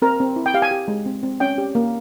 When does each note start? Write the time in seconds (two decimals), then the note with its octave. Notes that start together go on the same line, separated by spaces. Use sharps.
0.02 C4 A#4
0.20 C4
0.36 E4
0.46 G5
0.54 G4 F5
0.62 G#5
0.71 G4
0.88 G#3
1.06 C4
1.23 C4
1.40 C#4 G5
1.58 G4
1.75 A#3